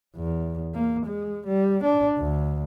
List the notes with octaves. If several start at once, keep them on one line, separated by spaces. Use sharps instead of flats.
E2
A#3
G#3
G3
D4
D2